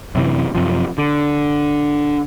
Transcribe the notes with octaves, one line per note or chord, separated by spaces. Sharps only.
F#2 C3 E3
F#2 C3 F3
D3